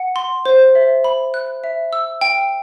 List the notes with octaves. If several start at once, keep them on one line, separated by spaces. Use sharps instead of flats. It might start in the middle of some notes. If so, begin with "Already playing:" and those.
Already playing: F#5
C6
C5
E5
B5
F#6
E5
E6
G5